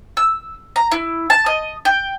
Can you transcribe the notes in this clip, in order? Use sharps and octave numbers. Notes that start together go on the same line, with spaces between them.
E6
A#5
E4
A5
D#5
G5